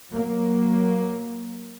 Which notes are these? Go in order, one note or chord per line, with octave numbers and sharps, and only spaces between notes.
F#3 A#3